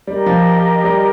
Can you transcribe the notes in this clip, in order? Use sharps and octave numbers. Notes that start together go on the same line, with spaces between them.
G3 G4 A#4 D#5
F3
G3